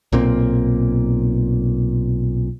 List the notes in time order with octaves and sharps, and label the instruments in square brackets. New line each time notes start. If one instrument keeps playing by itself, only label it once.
[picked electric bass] B1 A#2 A#3 C4